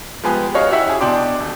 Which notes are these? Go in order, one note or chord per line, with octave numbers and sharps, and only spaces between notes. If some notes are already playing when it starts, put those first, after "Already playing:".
F3 G#3 B3 G4 G#4
C#4 F#4 G#4 C#5 D#5 F5
C#4 E4 F#4 G4 E5 F#5
E4 G#4
B2 D4 G5 C6 D6
D#1